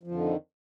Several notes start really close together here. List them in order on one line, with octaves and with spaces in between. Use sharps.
F3 F2 D3 D#3